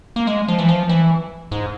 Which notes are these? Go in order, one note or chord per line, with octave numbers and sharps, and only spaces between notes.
A#3
G#3
F3
E3
F3
E3
G#2